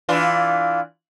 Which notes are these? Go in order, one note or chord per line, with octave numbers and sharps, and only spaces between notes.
E3 D4 F4